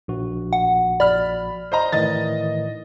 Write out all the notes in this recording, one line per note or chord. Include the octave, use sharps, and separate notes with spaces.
A#1 F#4
F#5
D5 B5 F6
C5 D#5 A#5
A2 D#3 E3 D#5 A6